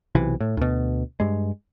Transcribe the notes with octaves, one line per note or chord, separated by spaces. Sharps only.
B1 C3 E3
A2
D2 B2
G2 G#3